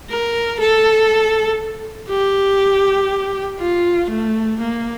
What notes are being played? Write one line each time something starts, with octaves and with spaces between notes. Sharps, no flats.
A#4
A4
G4
F4
A3
A#3